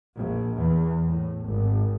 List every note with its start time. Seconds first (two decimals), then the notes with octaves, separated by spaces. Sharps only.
0.15 A#1
0.56 E2
1.05 A2
1.46 G#1